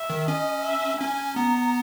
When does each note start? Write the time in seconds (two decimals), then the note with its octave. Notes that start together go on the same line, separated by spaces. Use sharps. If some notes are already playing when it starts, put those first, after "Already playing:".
Already playing: E5
0.10 D#3
0.28 C#4 D#5
0.64 E5
1.01 C#4 G#5
1.36 B3 A#5